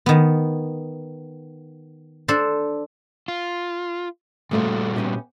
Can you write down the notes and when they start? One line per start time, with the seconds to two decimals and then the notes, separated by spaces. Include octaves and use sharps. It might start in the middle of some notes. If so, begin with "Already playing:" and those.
0.06 D#3 B3
2.28 D4 A4 C5
3.28 F4
4.51 A#2 C#3 G3 A3 F#4 C5
4.96 B3 C#4 G4